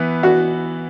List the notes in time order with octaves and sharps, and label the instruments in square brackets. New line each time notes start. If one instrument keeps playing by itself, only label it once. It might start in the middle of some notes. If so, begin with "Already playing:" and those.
Already playing: [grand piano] E3 B3 E4
[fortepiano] F#4